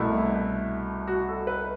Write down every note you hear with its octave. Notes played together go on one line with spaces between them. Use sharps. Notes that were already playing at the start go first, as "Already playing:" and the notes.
Already playing: C2 B2 A3 E4
F#4
A4
B4